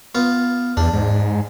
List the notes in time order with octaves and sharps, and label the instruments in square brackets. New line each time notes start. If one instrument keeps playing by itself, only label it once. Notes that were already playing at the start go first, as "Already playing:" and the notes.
[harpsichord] B3 F4
[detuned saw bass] E2 [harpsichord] D4
[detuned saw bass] G#2